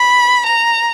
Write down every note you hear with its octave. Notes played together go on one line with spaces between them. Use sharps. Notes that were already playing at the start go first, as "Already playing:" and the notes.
Already playing: B5
A#5